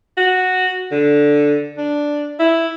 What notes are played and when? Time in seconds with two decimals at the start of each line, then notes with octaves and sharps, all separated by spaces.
0.17 F#4
0.91 D3
1.78 D4
2.39 E4